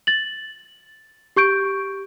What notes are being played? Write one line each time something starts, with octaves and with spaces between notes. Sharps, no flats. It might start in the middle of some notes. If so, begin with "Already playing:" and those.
A6 F#7
G4 C#6 G6 D7